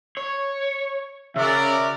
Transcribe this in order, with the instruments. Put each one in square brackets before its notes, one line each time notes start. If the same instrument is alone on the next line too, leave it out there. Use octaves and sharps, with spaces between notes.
[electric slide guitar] C#5
[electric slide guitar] C#3 [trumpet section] F#4 A#4 D5 [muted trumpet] E5